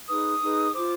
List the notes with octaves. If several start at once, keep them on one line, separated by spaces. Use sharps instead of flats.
D#4 G#4 B4 D#6
D#4 G#4 B4
F4 C5 D6